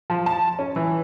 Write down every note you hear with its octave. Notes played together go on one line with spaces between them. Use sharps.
F3
A5
C#4
E3